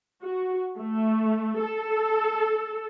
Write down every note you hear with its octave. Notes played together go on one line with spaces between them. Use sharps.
F#4
A3
A4